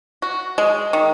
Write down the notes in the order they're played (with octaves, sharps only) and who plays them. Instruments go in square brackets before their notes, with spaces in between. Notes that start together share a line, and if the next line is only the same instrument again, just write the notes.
[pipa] F#4
G#3
D#3